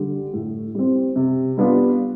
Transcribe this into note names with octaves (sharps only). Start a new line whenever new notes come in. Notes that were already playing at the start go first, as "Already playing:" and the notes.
Already playing: D3 G3
A2
G3 C4
C3
G3 B3 D4 F4